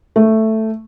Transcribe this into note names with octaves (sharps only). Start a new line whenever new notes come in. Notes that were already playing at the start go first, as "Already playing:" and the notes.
A3